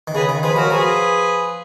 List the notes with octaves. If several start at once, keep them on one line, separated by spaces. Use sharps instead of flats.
D#3
C#3 G#4 B4
D#3
F3 G#4 B4
F#3 F#4 A#4
F3 G#4 B4